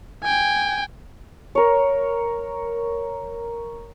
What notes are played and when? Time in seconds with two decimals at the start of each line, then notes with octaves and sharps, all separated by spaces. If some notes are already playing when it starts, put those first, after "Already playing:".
0.23 G5 G#5
1.55 A#4 C#5